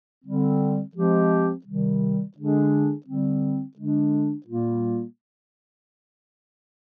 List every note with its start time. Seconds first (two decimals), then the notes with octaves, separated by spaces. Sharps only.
0.25 D3 G3 C4
0.96 F3 G#3 C4 G4
1.65 C3 D#3 G3
2.37 D3 G#3 D4 G#4
3.07 D3 G3 C4
3.76 D3 G#3 D4
4.47 A#2 G3 A#3 F4